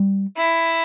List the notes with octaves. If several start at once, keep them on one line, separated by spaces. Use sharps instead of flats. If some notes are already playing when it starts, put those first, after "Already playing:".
Already playing: G3
E4